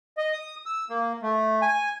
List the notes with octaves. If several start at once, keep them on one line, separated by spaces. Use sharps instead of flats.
D#5
D#6
E6
A#3
A3
G#5